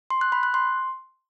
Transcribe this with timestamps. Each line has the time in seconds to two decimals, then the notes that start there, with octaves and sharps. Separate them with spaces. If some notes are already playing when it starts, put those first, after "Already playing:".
0.10 C6
0.21 F#6
0.32 B5
0.43 F#6
0.54 C6